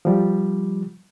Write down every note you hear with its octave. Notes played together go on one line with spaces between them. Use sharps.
F3 G3